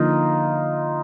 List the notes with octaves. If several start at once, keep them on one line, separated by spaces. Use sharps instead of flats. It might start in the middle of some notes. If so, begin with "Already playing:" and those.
Already playing: D3 F3 A#3 D#4 F4